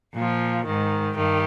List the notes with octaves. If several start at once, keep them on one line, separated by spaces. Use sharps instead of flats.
A#2 F3
G#2 D#3
G2 D#3 G4